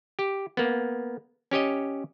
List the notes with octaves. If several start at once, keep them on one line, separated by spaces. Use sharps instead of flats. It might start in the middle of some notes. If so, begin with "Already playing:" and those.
G4
A#3 B3
C#4 G4 C#5 D#5